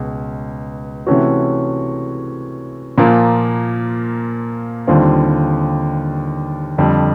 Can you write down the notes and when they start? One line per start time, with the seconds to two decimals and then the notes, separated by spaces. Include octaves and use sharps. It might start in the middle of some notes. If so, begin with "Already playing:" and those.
Already playing: C#2 B2
1.07 C3 E3 A3 C#4 F#4
2.98 A#2 F3 A#3
4.87 D#2 D3 G3 C4 F4
6.78 F2 D3 G3